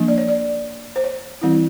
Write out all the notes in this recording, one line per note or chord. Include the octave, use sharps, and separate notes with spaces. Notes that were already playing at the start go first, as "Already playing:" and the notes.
Already playing: F3 A#3 D4
D5
C#5
D5
C5
C#5
E3 G3 C4 E4